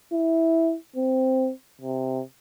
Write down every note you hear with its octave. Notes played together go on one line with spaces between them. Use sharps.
E4
C4
C3